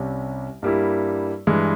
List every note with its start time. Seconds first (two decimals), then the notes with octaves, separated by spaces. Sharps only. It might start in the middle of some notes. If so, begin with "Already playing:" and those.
Already playing: C2 C3 G3 C#4
0.63 G2 G3 A#3 E4
1.47 G2 E3 G#3